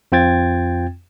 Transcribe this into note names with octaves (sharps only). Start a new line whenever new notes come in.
F2 C4 F4 G5 G#6 A6